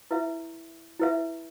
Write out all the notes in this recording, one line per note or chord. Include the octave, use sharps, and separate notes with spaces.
E4 B4 E5
E4 B4 E5